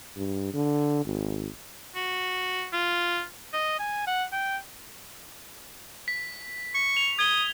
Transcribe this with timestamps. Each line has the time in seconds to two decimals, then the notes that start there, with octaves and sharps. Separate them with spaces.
0.16 G2
0.54 D3
1.05 G#1
1.96 F#4
2.73 F4
3.54 D#5
3.79 G#5
4.07 F#5
4.33 G5
6.08 B6
6.75 C#6
6.97 F7
7.19 D#6 G#6 G7